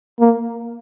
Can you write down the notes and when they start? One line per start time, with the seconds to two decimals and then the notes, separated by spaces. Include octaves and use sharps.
0.20 A#3